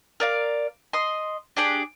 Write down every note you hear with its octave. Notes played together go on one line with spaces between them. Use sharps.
A#4 D5 F5
D#5 C6
D4 G4 G#4 D5